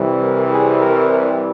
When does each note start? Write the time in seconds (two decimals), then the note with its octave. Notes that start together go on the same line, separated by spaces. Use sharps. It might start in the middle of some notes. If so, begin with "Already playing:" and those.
Already playing: C2 C3 E3 G3
0.21 A#4
0.50 G#4
0.80 A#4